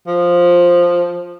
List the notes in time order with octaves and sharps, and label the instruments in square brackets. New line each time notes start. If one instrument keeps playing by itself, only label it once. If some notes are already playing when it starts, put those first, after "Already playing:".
[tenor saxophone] F3